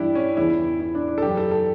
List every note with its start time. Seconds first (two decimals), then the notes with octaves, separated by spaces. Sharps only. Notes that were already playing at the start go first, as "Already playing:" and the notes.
Already playing: G2 E3 D4 E4 G4
0.15 C#4
0.37 E2 C#3 E3 E4
0.80 E4
0.95 D4
1.08 D4
1.18 A4
1.22 F#2 C#3 E3 G4
1.37 A4
1.51 A4